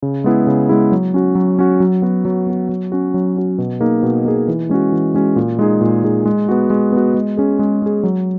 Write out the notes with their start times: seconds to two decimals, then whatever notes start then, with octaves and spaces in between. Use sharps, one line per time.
0.02 C#3
0.24 G#3 B3 E4 G#4
0.47 C#3
0.69 G#3 B3 E4 G#4
0.92 F#3
1.14 C#4 F#4
1.35 F#3
1.59 C#4 F#4
1.80 F#3
2.02 B3 F#4
2.25 F#3
2.47 B3 F#4
2.69 F#3
2.92 C#4 F#4
3.14 F#3
3.37 C#4 F#4
3.58 B2
3.80 A#3 D#4 G#4
4.03 B2
4.25 A#3 D#4 G#4
4.48 E3
4.69 G#3 C#4 F#4
4.92 E3
5.14 G#3 C#4 F#4
5.36 A#2
5.59 G#3 D#4 G#4
5.81 A#2
6.04 G#3 D#4 G#4
6.25 G#3
6.49 B3 F#4
6.70 G#3
6.92 B3 F#4
7.14 G#3
7.37 C#4 G#4
7.59 G#3
7.82 C#4 G#4
8.03 F#3